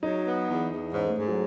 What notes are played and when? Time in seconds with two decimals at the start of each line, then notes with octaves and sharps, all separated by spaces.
0.03 F#3 D#4
0.25 B3
0.49 E2
0.71 E2
0.94 G#2 C#4
1.06 A3
1.17 G#2
1.28 F#3